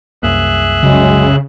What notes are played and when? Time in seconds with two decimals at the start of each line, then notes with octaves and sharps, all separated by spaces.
0.23 C2 F#2 A#3 G#4 E5 F#6
0.83 C#3 F#3 G#3